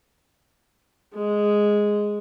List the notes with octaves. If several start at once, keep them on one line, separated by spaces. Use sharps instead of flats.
G#3